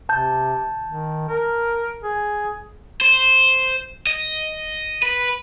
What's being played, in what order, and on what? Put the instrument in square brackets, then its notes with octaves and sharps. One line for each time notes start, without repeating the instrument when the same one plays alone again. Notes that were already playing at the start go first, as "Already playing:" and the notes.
[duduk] C3 [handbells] A5 G6
[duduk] D#3
A#4
G#4
[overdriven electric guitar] C5
D#5
B4